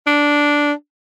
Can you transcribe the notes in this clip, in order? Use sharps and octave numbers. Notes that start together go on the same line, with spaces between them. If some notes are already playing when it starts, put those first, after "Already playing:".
D4